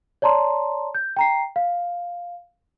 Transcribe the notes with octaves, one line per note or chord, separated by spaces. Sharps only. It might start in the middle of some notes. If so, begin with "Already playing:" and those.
C#5 D5 A5 A#5 C6
G6
G5 A#5 C7
F5